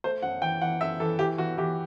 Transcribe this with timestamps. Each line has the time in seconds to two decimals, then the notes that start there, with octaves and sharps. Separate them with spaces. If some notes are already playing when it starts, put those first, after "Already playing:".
0.04 A3 C5
0.22 F#2 F#5
0.42 E3 G5
0.62 E3 F#5
0.81 F#2 E5
1.00 E3 A4
1.19 E3 G4
1.38 E3 F#4
1.58 E3 G4